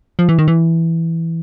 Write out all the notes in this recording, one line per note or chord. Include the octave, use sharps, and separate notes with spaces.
F3
E3
D#3
E3